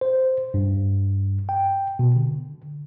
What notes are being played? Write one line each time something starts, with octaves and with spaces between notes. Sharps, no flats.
C5
G2
G5
B2
D3